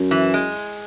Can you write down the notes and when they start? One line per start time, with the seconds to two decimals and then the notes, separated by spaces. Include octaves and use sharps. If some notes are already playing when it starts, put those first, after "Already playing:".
Already playing: F#2
0.11 E3
0.34 G#3